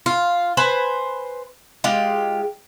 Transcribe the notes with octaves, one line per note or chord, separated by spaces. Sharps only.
F4
B4 C5 G#5
G#3 F4 G4